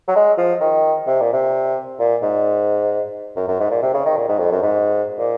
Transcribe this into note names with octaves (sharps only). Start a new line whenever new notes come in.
F#3
G#3
F3
D#3
C3
A#2
C3
A#2
G#2
F#2
F#2
G#2
A#2
C3
C#3
D#3
A#2
G#2
F2
F#2
G#2
A#2